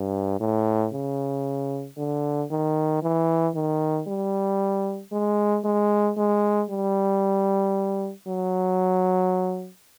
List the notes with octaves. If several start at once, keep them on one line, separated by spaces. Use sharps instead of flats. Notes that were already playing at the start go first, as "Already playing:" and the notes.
Already playing: G2
A2
C#3
D3
D#3
E3
D#3
G3
G#3
G#3
G#3
G3
F#3